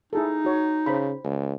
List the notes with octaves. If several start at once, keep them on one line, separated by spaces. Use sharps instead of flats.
D#4 E4 G#4 A4
F#4 C#5
C#3 C5 B5
C#2